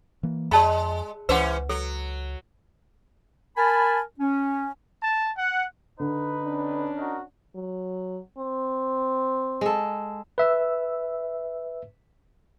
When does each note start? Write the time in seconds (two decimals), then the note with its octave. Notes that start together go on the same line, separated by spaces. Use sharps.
0.23 E3 A#3
0.51 F2 G#3 D5 A5 B5
1.29 C#2 E3 C#4 B4 C5 F#5
1.69 F#3 A4
3.57 A#4 G#5 A5 B5
4.20 C#4
5.01 A5
5.35 F#5
6.00 D3 D#4 B4
6.42 C#4 D4
6.97 D#4 F#4 A#4
7.56 F#3
8.38 C4
9.61 G#3 A4
10.38 B4 E5 E6